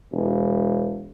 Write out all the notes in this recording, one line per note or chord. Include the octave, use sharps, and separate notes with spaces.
E1